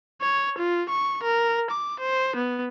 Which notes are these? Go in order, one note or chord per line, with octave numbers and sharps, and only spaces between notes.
C#5
F4
C#6
A#4
D6
C5
B3